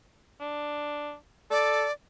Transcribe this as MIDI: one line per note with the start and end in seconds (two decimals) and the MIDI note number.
0.40 1.15 62
1.51 1.86 69
1.51 1.92 74